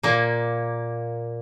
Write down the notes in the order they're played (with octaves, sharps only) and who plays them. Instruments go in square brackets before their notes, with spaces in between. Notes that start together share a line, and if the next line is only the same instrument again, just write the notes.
[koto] A#2 A#3